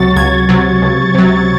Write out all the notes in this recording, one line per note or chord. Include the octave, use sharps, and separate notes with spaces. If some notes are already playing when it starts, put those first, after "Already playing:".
Already playing: C#2 C3 F#3 C#6 A6
C#2 G#6
C3 F#3
C#2
C3 F#3